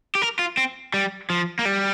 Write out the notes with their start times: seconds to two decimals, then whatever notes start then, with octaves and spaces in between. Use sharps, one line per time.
0.15 G4
0.22 A#4
0.39 F4
0.57 C4
0.94 G3
1.30 F3
1.59 A#3
1.65 G3